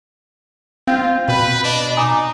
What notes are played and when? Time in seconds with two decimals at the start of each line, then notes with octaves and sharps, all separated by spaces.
0.87 C4 F4 F5 G5 G6
1.28 B2 B4 B5
1.64 D4 D#5
1.97 D#4 G#5 A#5 D6 D#6